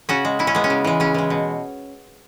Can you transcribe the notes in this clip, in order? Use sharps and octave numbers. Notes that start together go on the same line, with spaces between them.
C#3 C#4 F#4
G#3
C#3 E4
C#4
G#3 B3
C#4
C#3
E3 G#3
C#3 C#4
E3 G#3
B2